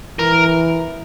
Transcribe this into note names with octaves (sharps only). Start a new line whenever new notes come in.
E3 A#4